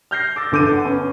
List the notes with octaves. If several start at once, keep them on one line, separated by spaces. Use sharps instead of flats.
F6 G6 A#6 C7
D6 E6 A6
G1 D3 D6 G6 D#7
F#5
B3 C#4